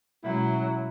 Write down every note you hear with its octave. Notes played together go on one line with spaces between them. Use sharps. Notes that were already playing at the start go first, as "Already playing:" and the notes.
B2 F#3 G#3 C#4 E4